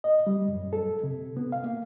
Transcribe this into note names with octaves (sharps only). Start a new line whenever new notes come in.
D#5
G3
F#2
A4
C3
B3
F5
A#3